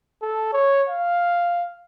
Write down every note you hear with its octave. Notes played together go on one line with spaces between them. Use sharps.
A4
C#5
F5